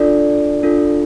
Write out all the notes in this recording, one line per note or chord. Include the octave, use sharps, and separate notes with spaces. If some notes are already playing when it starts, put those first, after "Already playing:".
Already playing: D4 F4 A4 D5
D4 F4 A4